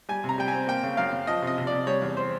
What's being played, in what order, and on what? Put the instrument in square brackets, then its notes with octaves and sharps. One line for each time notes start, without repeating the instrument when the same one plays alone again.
[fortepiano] G3 G#5
C3
A#5
G3 G5
G#5
C4
A#3 G5
C#3
F#2 F5
C#3
F3 D#5
C3 D#5
C3
D5
C3
G3 C#5
E2
C5